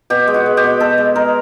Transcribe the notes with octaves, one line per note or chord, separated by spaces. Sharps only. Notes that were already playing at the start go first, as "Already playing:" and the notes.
B2 G4
G#3
F#4
G#3
G4
B2
B2 A4
G#3
G#3 A#4